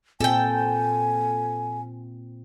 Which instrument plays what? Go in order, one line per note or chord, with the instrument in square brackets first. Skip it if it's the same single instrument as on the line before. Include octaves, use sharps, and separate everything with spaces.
[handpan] A#2 C4 F4 [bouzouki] A4 G5 [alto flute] G#5